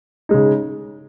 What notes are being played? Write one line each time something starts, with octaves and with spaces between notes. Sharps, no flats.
C#3 G#3 D#4